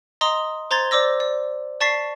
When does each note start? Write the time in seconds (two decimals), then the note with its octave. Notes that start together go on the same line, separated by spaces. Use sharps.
0.21 D#5 A#5 C6 D#6 G7
0.71 C5 A#5 C6 G#6 A6
0.91 C5 D5 D6 E6 A#6
1.20 D5
1.80 D5 A5 C#6 A6 B6 C7